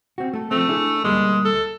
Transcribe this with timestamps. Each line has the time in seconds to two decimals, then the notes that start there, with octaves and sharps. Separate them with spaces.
0.18 C4 F#4
0.33 A3 A4
0.51 F3 A3 C4
0.68 D4 E4 G#4
1.04 D2 G3 G#3 A#3
1.45 A4